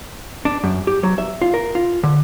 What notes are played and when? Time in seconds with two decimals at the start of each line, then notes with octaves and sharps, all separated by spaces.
0.45 D4
0.64 F#2
0.87 G4
1.03 F#3
1.18 E5
1.42 F4
1.54 A#4
1.75 F4
2.03 D3